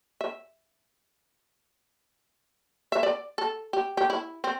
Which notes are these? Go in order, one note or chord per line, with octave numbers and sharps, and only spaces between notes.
E5
E5
D5
A4
G4
G4
E4
C4